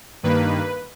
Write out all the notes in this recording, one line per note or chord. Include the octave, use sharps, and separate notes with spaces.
G2 D#3 A#3 B4